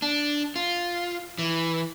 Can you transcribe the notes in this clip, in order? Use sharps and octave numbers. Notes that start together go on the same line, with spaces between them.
D4
F4
E3